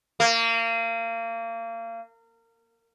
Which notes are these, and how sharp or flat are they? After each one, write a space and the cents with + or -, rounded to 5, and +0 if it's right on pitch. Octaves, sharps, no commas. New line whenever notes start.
A#3 -30